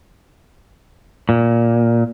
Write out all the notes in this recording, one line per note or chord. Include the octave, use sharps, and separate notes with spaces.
A#2